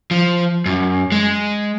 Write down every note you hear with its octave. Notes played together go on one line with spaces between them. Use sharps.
F3
F#2
G#3